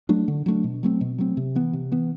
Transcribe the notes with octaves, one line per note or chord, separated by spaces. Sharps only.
F#3 A3 D4
D3
F#3 A3 D4
B2
F#3 A3 C4
B2
F#3 A3 C4
C3
E3 B3
C3
E3 B3